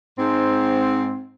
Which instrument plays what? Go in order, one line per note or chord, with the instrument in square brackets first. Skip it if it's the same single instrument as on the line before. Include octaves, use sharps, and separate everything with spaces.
[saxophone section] G#2 C4